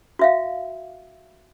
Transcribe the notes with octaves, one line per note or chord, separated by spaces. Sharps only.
F#4 E5 F5